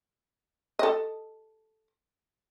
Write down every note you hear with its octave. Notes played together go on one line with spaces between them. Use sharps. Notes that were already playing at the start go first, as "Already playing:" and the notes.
A4 D#5